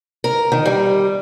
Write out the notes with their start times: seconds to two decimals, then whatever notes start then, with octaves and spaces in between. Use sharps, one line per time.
0.24 A#4
0.52 D#3
0.66 G3